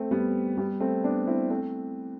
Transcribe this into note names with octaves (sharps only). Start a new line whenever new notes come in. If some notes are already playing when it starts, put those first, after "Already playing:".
Already playing: A3 C4
G3 B3
G3 B3
A3 C4
B3 D4
C4 E4
A3 C4